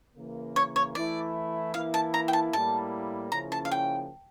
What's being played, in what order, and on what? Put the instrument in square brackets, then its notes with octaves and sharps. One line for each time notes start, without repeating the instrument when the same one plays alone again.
[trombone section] C#3 E3 A#3
[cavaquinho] C#5
C#5
[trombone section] E3 A3 E4 [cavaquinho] D5
[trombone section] E3 A#3 E4 [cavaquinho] F5
[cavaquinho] A5
A#5
G5
A5
[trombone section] A2 G3 A#3 E4 [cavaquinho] A5
[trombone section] C#3 F3 A#3 C#4 E4 [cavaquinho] A#5
[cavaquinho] A5
F5
G5